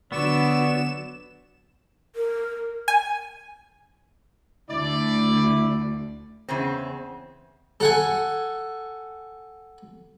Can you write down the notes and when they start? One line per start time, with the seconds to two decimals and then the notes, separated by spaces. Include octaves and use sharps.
0.12 D3 F#3 B3 D5 C#6 E6 E7
2.16 A#4
2.88 G#5
4.69 D2 E4 D5
6.48 E2 C#3 C4
7.80 A4 F#5 G#5